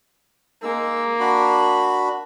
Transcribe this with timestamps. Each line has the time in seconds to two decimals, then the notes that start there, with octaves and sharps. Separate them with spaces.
0.63 G#3 A#3 D#4 E6
1.20 D4 F#4 B5